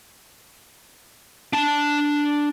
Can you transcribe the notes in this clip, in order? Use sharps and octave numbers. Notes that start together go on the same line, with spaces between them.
D4 A5